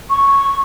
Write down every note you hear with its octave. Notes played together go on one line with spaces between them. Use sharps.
C#6